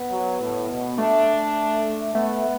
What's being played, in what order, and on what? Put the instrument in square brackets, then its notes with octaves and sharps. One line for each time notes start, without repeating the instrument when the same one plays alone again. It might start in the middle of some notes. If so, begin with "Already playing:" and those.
Already playing: [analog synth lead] B3
[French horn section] F#3
A2
B2
[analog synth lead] A3 [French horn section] D4
[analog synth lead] A3 [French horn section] B3